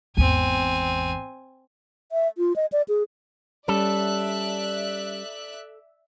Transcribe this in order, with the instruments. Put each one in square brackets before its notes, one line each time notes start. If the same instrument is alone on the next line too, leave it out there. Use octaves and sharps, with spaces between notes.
[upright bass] G#1 E2 [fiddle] C4 G#5
[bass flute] E5
F4
D#5
D5
G#4
[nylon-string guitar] G3 C#4 [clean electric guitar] A4 [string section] D5 E5 F#6